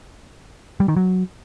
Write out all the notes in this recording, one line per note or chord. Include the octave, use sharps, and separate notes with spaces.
G3
D#3
F#3